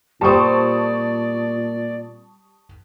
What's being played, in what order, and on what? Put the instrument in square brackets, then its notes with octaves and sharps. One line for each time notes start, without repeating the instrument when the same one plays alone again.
[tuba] A#2 [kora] G3 C4 [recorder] D5 [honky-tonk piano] A5 C#6 D#6